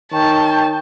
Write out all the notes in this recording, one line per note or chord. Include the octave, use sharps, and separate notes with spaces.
D#3 C#5 G5 A5